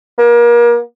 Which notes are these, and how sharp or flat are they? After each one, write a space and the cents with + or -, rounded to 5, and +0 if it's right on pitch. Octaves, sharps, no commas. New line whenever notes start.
A#3 +35